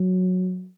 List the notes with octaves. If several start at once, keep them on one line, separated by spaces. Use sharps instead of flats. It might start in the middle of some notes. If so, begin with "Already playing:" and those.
Already playing: F#3